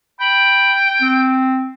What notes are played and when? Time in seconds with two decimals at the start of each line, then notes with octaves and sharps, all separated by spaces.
0.20 G5 B5
1.01 C4